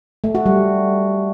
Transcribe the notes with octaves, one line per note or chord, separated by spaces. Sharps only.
A3
F#4
G3